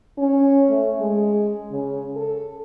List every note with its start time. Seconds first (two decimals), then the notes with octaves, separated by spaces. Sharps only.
0.18 C#4
0.70 A3
1.00 G#3
1.71 C#3
2.16 A4